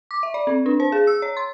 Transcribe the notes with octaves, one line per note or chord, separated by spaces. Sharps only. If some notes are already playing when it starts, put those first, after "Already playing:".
D6
E5
D5
C4
D4
C5
G#4
E6
C#5
C6